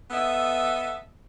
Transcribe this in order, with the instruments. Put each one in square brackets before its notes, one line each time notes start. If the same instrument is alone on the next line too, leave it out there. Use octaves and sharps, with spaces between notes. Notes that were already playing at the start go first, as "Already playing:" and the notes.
[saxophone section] B3 A4 D#5 E5